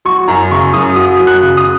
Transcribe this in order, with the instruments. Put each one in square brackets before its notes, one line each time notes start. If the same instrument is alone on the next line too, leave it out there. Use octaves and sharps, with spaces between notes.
[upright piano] F#3 C#6
F#2 A#5
C#3 C#6
F#2 D#6
F#3 D#6
F#2
F#6
C#3
D#6